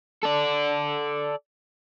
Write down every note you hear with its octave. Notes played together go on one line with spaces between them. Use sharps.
A4 D5